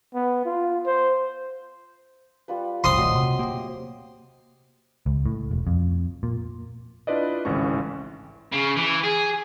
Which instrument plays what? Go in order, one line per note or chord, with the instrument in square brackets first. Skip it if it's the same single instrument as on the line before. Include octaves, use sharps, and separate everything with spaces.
[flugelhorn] B3
F4
C5
[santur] G3 F4 B4
[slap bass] F#1 C2 [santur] C4 [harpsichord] C6 D#6
[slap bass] D#1 A3 [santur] F#3 D#5
[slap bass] C3
[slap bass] A#3 [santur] G4
[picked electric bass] C#2
A2
E1
F2
A#2
[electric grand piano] D4 E4 F4 B4 D5 D#5
G#1 C#2 A2 E3 C#4 C#6
[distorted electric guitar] C#3
E3
G#4